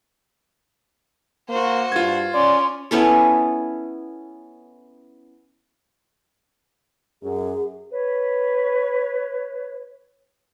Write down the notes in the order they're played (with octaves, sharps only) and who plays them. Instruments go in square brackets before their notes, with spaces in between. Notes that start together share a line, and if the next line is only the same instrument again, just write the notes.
[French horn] A#3 [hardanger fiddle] F#4 C5
[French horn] G2 [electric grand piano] F4 G#6
[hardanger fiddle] C#4 [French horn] D5 [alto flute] C6
[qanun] B3 C#4 E4 A4
[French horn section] F#2 [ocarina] G#4
[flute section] B4 C#5